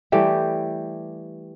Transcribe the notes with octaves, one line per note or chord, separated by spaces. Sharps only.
E3 G3 A3 G4